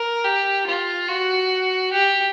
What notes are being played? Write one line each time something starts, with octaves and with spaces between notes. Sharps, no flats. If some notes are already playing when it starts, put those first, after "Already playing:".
Already playing: A#4
G4
F4
F#4
G4